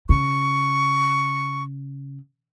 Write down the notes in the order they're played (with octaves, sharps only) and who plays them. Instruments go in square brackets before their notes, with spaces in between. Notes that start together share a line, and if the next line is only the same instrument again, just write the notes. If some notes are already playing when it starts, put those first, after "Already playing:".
[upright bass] C#3 [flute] C#6